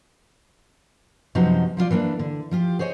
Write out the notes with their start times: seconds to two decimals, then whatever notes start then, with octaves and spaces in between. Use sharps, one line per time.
1.35 F#2 C3 F3 B3 D#4 F#4
1.77 F3 E4 F4 D5
1.91 E3 A#3 C#4 D4
2.19 D3
2.51 F3 F4 G4
2.79 G#4 C5 C#5 D#5 G#5